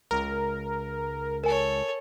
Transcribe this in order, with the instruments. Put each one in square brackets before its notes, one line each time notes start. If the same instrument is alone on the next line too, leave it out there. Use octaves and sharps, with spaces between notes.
[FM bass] C#2 [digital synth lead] A#4
[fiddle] A4 C#5 [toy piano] A#4 G#5